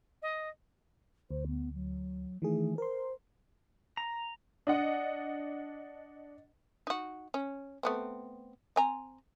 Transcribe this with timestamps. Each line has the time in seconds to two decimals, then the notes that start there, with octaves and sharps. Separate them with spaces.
0.22 D#5
1.31 D2 C5
1.47 B3
1.74 F#3
2.42 D#3 E3 A3 G#4
2.78 A#4 C5 C6
3.97 A#5
4.67 D4 D#5 F#5
6.87 D#4 F#4
7.34 C#4
7.83 A3 B3 C4
8.76 C4 G#5 A#5